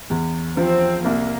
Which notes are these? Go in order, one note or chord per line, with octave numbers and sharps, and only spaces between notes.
E2
F3 C4
C2 A#3